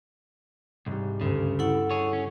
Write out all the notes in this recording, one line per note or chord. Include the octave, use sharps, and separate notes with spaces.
C2 G#2 G3
D2 G2 C#3
E4 A4 F#5 C#6 D7
G#4 C#5
C#4